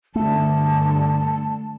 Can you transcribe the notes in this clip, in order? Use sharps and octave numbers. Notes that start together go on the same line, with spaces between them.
G2 D3 A3 A5